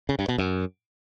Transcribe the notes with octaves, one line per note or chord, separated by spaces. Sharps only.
C#3
G2
B2
F#2